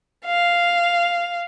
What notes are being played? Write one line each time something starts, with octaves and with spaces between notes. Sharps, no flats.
F5